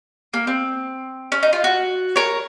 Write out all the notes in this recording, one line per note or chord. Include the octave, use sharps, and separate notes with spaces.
A#3
C4
C#4
D#4
F4
F#4
A#4 C#5